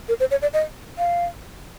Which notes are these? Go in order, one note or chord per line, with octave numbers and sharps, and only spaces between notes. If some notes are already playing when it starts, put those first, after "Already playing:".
A#4
C5
C#5
D5
D#5
F5